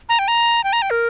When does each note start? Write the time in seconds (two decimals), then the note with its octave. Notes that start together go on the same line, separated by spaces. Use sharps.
0.09 A#5
0.19 G5
0.28 A#5
0.64 G5
0.73 A#5
0.82 G5
0.90 A#4